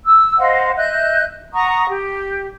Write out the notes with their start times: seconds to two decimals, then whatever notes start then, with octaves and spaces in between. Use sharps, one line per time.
0.04 E6
0.38 C5 D#5 F5 F#5
0.76 D#5 E5 F#6 G6
1.53 F#5 A#5 C#6 D#6
1.88 G4